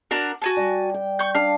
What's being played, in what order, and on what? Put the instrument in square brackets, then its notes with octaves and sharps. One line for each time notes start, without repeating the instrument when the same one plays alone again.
[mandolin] D4 F#4 A#4
F#4 G#5 A5
[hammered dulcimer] G3
G5
[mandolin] C#6 G6
[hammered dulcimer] D4 [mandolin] F5